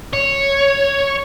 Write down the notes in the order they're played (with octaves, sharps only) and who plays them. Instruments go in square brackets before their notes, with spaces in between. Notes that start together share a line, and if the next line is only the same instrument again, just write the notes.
[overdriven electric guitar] C#5